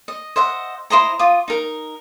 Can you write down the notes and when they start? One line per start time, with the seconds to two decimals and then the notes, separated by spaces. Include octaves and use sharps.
0.08 D#5
0.36 C5 D#5 E5 F#5
0.90 E4 C5 D#5 A#5
1.19 F4 D6 D#6
1.48 D#4 A#4